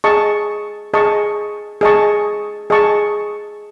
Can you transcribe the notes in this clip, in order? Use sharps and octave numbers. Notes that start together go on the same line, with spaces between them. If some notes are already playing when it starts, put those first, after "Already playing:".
G#4 D#5 A5 C#6
G#4 D#5 A5 C#6
G#4 D#5 A5 C#6
G#4 D#5 A5 C#6